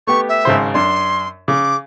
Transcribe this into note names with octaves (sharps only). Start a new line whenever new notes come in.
A3 B3 G4 C#6
E5
G#1 C#3 C5
F#2 D4 C6
C#3 D6